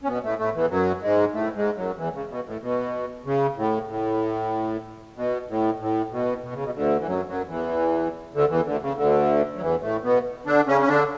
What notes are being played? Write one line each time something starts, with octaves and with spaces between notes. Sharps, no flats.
C#4
B2 B3
A2 A3
A2 A3
E2 E3
F#2 F#3
G#2 G#3
A2 A3
G#2 G#3
F#2 F#3
E2 E3
C#3
B2
A2
B2
C#3
A2
A2
B2
A2
A2
B2
B2
C#3
B2
D2 D3
E3
F#2 F#3
F#2 F#3
E2 E3
D2 D3
E2 E3
D2 D3
C#3
D2 D3
F#3
E2 E3
A2 A3
B2 B3
D3 D4
C#3 C#4
C#4
D3 D4